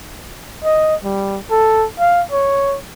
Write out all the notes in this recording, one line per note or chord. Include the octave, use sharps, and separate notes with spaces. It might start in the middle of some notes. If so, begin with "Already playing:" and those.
D#5
G3
A4
F5
C#5